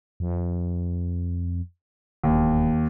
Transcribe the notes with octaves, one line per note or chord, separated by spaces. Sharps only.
F2
E1 D#2